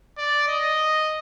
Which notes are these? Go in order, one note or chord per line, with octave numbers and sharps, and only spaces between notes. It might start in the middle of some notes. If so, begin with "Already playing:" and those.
D5
D#5